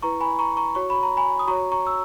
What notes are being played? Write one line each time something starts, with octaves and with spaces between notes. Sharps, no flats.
E4 B4 A#5 C#6
G#5 B5
A#5 C#6
A#5 C#6
F#4 C#5 C#6
B5
A#5
G#5 B5
D#6
F#4 C#5 A#5 C#6
A#5 C#6
E6